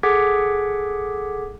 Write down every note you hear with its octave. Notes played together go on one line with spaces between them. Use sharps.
G#4 A4 F#5 D6 G#6 B6